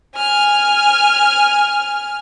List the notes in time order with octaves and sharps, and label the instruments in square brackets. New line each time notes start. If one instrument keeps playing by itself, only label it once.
[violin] G#5 F6